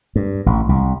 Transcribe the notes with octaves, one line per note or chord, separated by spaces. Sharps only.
G2
A1
C2